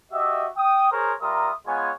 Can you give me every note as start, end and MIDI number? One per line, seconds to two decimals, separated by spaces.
0.12 0.48 66
0.12 0.48 67
0.12 0.48 75
0.12 0.48 76
0.57 0.90 79
0.57 0.90 87
0.92 1.13 68
0.92 1.13 70
0.92 1.13 72
0.92 1.13 73
0.92 1.13 82
1.22 1.51 55
1.22 1.51 65
1.22 1.51 70
1.22 1.51 76
1.22 1.51 82
1.22 1.51 87
1.67 1.91 56
1.67 1.91 59
1.67 1.91 65
1.67 1.91 73
1.67 1.91 80